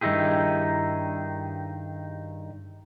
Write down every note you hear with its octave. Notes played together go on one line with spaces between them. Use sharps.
G2 D#3 D#4 E4 G4 G#4